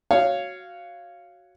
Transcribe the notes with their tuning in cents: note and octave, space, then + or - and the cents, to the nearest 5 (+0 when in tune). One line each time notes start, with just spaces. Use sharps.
F#4 +0 C#5 +0 F5 -10